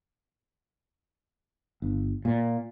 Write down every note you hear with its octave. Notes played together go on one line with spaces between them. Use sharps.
G1
A#2